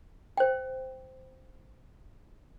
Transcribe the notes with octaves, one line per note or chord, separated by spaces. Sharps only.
C5 G5